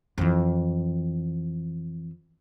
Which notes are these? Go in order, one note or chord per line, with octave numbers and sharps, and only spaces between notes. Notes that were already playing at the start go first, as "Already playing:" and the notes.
F2 E3